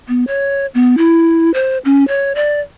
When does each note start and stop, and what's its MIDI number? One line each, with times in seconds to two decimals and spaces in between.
0.08 0.24 59
0.27 0.66 73
0.74 0.95 59
0.98 1.53 64
1.54 1.78 72
1.85 2.06 61
2.08 2.33 73
2.35 2.60 74